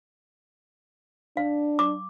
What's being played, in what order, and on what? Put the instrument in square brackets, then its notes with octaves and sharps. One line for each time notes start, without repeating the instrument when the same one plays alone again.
[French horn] D4 [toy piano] F5
[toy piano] D6